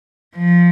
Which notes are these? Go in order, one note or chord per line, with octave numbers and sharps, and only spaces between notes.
F3